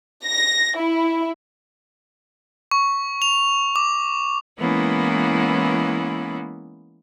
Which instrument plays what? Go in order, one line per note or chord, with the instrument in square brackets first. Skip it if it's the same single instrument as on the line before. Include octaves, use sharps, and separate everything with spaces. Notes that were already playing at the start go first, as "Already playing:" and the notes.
[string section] A#6
E4
[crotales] C#6
F7
D6
[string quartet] E3 G#3 A#3 B3 C#4 E4